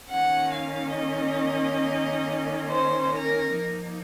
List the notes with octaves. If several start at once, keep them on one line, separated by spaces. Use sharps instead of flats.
D#3 A#3 C#4 F#5
F5
D#5
C5
A#4
F3 A#3 D#4